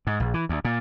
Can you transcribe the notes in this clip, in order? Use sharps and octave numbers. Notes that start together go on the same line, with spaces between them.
G#2
A#1
E3
D2
A#2